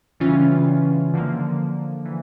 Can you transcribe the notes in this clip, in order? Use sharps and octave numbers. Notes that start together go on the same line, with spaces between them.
C#3 E3 G3 C#4 F4
D3 F3 A#3
E3